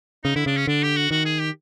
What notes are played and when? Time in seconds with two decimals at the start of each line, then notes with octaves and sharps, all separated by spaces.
0.24 C#3 D#4
0.36 D3 E4
0.46 C#3 D4
0.57 C#4
0.67 D3 D4
0.83 G4
0.96 F#4
1.11 D#3 F#4
1.25 G#4
1.40 G4